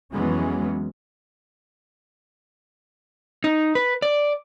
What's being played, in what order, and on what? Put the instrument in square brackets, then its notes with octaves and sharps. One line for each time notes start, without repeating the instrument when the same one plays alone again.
[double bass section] F2 E3 F#3 G#3 B3 C#4
[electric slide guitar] D#4
B4
D5